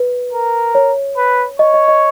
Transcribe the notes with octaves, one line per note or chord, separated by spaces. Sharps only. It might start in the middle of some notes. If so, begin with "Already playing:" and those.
Already playing: B4
A#4
C#5
B4
C#5 D#5
D#5
D#5